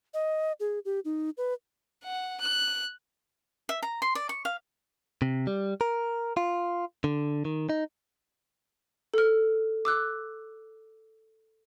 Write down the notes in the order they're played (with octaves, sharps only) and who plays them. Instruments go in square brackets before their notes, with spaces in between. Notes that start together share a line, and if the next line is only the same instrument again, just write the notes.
[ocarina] D#5
G#4
G4
D#4
B4
[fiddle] F#5
F#6
[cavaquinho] E5
A#5
C6
D5
C#6
F5
[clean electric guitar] C3
G3
A#4
F4
D3
D#3
D#4
[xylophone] A4 F6
D6 E6 F#6